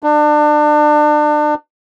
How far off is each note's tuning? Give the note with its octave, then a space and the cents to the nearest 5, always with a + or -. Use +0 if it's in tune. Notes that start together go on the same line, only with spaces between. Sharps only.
D4 +30